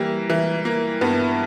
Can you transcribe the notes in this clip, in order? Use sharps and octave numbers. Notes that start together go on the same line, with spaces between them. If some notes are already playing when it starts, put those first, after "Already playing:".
Already playing: E3 G3 A#3
E3
A#3
G2 B3